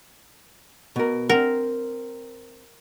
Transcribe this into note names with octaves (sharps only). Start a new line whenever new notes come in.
B2 A#4
C4 A#4 F#5